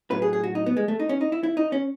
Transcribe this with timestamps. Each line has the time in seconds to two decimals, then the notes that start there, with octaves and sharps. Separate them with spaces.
0.11 A2 F#3 B4
0.22 G#4
0.33 G#4
0.43 F#4
0.55 D#4
0.66 B3
0.77 G#3
0.88 A3
1.00 D#4
1.09 C#4
1.21 D#4
1.32 E4
1.43 E4
1.57 D#4
1.72 C#4